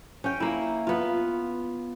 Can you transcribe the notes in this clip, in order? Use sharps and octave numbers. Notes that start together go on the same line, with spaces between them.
C#4 G5
A#3 E4
B3 F4